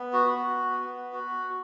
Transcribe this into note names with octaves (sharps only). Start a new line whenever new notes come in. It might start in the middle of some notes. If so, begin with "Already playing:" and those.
Already playing: B3
F#4
F#4
B3
F#4